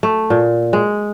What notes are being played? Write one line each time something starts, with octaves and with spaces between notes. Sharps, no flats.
A3
A#2
G#3